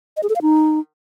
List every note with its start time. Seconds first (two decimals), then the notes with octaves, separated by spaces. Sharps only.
0.17 D#5
0.23 G#4
0.29 A4
0.36 F5
0.42 D#4